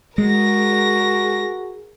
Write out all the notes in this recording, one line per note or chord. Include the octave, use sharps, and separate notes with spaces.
G#3 F#4 G#4 A#4 A#6